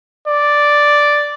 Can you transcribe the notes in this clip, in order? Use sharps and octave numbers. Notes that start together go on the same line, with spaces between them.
D5